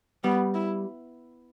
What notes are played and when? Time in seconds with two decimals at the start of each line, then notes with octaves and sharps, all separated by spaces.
0.24 G3 B3
0.54 E4